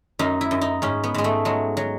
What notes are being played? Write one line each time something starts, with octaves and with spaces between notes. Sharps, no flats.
F#2 D#4
E4
F#2
D#4
G#2 C#4
B3
G#2 G#3
A3
F#3 G#3
F#3